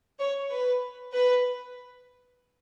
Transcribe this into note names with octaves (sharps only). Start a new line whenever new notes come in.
C#5
B4
B4